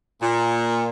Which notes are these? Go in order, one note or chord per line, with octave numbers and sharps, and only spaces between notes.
A#2